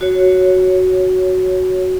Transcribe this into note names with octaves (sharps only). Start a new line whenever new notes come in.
F#4 C#5